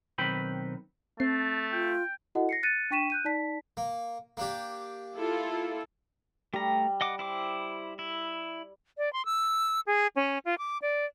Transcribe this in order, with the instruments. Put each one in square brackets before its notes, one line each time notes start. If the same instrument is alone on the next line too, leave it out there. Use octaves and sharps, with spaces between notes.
[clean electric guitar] B1 D#3 C4 B4 G5 B5
[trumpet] A3 [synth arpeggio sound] C4 C7 [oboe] A5
[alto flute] F4 [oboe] G5
[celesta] E4 F#4 A4 D#5 F#5
A#6 C7 C#7
F#6 A6 C#7 D#7
D4 G5 C#6 B6 D#7 E7
F#6 G6 D#7
D#4 D5 A5 B6
[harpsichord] A#3
A#3 D4 G4
[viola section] E4 F4 A4
[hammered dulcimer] G3 [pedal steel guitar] A3 A#5
[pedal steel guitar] D#5 F#5 D6
E4 C5 D6
E4
[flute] D5
C6
E6
G#4
C#4
F4
D6
D5